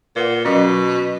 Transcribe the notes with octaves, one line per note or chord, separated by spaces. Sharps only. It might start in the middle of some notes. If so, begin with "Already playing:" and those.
A#2 B4 F#5
B2 F#3 C#4